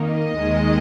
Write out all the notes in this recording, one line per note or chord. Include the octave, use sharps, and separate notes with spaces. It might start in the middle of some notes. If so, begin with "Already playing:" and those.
Already playing: F2 D#3 A#3 D#4
D#5
D#2 D#3 G#3